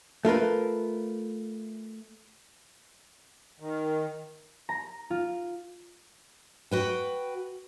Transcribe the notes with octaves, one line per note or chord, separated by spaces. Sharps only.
A3 F4 A#4 B4
D#3
A#5
F4
F#4 B4 G5